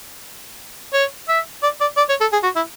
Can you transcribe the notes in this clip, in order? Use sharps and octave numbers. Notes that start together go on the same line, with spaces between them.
C#5
E5
D5
D5
D5
C#5
A4
G#4
F#4
E4